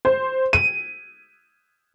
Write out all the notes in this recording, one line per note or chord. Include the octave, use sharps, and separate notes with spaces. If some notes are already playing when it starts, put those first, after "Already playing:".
C5
D#7